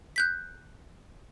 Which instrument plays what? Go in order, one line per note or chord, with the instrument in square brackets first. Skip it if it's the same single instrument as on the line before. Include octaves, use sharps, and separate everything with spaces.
[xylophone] F#6 G6 B6